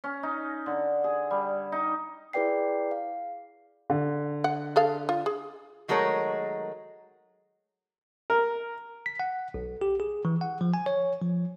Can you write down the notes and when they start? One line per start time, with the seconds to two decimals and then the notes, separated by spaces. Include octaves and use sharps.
0.04 C#4
0.23 D#4
0.66 D3
1.04 G#4
1.31 G3
1.72 D#4
2.33 E4 G#4 B4 D5 G5 C7
2.91 F5
3.90 D3
4.44 F#5
4.76 G#4 A4 F5
5.09 F4
5.26 G#4
5.88 D#3 F#3 G#3 A3 A#4 C#5
8.30 A#4
9.06 B6
9.20 F#5
9.54 B1
9.81 G4
10.00 G#4
10.25 E3
10.41 F#5
10.61 F3
10.74 G#5
10.86 C#5
11.22 F3